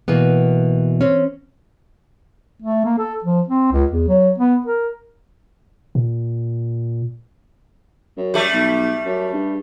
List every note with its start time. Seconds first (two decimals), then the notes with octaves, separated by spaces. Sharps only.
0.08 B2 E3 A#3 B3
1.01 C4 C#4
2.62 A3
2.85 A#3
2.98 A4
3.24 F3
3.48 C4
3.72 C#2
3.92 E2
4.08 F#3
4.38 B3
4.66 A#4
5.95 A#2
8.17 F#2
8.34 G3 A3
8.53 B1
9.06 F#2
9.34 G2